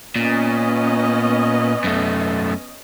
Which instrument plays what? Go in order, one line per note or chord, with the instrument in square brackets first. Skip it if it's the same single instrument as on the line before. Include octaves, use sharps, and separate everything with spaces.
[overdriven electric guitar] A#2 [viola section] B3 C#4 D#5
[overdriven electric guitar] F#2 A3